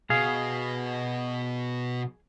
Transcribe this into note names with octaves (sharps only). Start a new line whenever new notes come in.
B2 G#4 F5